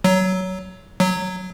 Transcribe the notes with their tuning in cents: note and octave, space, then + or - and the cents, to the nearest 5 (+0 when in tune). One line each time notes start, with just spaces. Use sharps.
F#3 +15
F#3 -5